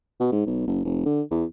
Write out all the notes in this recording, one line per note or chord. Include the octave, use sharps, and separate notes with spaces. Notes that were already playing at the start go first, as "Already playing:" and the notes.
B2
G#2
B1
F#1
F1
D3
E2